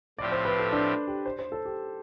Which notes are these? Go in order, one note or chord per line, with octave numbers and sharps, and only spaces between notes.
A2 F3 C4 G4 D5
C5
B4
A4
D4
G4
C5
C5
A4
G4